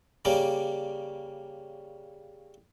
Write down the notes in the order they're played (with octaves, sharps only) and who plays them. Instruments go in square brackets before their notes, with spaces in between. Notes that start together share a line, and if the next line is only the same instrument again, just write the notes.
[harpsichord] C#3 G3 A#3 D5